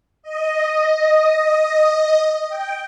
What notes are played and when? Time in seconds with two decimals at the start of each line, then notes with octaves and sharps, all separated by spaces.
0.23 D#5
2.48 G5